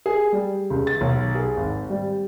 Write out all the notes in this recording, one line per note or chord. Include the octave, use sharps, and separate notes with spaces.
G#4
G3
C#2
A6
B1
G#4
G#1
G3